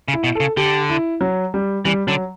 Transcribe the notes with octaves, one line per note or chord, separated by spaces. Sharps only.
C#3
E4
B2
C#3 A4
D3 G4
E4
F#3
G3
E3 G3
D3 F#3